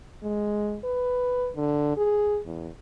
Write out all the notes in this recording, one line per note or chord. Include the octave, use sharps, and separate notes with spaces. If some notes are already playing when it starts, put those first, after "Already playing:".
G#3
B4
D3
G#4
E2